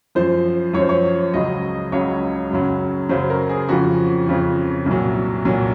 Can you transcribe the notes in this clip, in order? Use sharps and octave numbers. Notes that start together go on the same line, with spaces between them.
F#2 F3 C5
F#2 F3 C#5
C5
C#5
C#2 C#3 F#3 D#5
C#2 C#3 F#3 C#5
F#2 C#3 F#3
F#2 C#3 F#3 C5
A#4
G#4
F2 C#3 F3 F#4
F2 C#3 F3
C2 A#2 F#3
C2 A#2 F#3